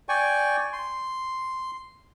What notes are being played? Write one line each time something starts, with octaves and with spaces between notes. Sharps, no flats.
D5 G5 G#5 C#6
C6